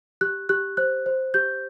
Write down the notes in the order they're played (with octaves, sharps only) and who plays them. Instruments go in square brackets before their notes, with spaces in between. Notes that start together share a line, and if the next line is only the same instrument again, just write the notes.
[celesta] G4 F#6
G4 F#6
C5 F#6
C5
G4 G6